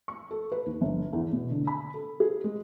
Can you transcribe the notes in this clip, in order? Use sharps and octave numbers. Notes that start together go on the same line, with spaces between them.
C#6
A4
B4
D#2
G1
E2
B2
D3
B5
A4
G#4
G#3